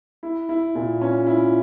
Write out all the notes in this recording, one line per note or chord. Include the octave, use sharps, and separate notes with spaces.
E4
E4
A#2
C#4
E4